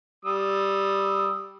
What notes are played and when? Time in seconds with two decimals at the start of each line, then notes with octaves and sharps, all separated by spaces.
0.25 G3 D#6 E6